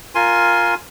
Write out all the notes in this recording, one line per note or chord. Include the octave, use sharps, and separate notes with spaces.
F4 A#4 G#5 C6